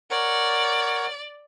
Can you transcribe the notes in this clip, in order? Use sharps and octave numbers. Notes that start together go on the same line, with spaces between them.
A#4 C#5 D5 F#5